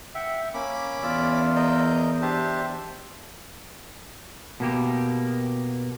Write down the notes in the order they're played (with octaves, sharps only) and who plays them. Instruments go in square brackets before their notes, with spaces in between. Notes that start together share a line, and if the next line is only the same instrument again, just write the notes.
[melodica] E5 [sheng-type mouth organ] F#5 G5
[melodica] A#3 [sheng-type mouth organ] C#4 B5 D6
[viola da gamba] E2 [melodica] F4 D5 E6
[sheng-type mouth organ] A#4 D#5 G6
[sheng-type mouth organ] D4 G4 A5 [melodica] C5 E5
[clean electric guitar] B2 A#3 G4